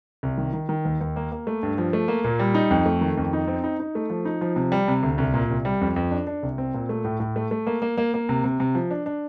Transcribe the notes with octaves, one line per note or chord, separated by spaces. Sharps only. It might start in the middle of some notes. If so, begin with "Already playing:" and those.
C2
D#3
D#3
D#3
D#2
D#2
A#3
A#3
A3
G2
F3
A3
A#3
A#2
G3
D#4
F2
A3
D#3
F2
D#4
C4
D#4
D#4
A3
F3
D#4
F3
C3
G3
C3
D2
C2
A#2
C2
G3
F2
F2
D4
D4
C2
C4
A#2
A3
A2
A2
A3
A3
A#3
A#3
A#3
A#3
C3
C3
C3
F3
D4
D4